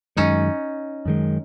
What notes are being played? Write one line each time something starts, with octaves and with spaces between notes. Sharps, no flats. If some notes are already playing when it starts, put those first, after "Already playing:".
F#2 D#3 G#3 C#4 D#4
F#2 D#3 G#3